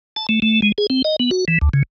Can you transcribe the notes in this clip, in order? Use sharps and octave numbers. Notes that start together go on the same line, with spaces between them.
A5
A3
A3
G#3
G#4
C4
D#5
B3
F#4
E3
D2
C#3